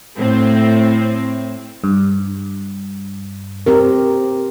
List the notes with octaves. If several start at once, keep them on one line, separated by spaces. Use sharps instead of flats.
A2 C4
G2
C4 G4 A#4